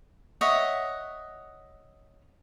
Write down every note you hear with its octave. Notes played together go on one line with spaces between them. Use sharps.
C#5 D#5 E5 F#5